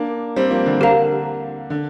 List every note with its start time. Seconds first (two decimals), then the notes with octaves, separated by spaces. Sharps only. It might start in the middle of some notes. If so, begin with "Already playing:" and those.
Already playing: A#3 D4
0.36 G3 C4
0.51 F3 A#3
0.66 D3 G3
0.80 D3 G4 A#4 F5 A#5
1.70 D3